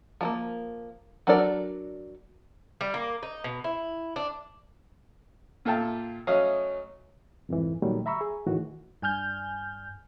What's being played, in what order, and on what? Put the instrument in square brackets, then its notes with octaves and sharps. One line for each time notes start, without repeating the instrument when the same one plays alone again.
[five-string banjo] F3 G#3 A#3
F#3 D4 A4 A#4 D5
[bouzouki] G3
A#3
D#4
B2
E4
D4
[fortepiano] A#2 F4 A4 E5 G5 A5
F#3 A3 C#4 D#5 F5 D#6
[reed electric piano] C2 F2 G#2 E3
A#2 D#3 F#3 G3 A3
E5 A#5 B5 C#6 E6
G#4
A2 D#3 E3 F#4
[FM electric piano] G2 G#5 F6 G6